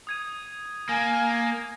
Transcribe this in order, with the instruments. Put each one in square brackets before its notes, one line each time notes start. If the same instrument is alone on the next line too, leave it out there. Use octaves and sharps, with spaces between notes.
[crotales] D#6 G#6 D#7
[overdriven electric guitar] A#3 [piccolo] G#5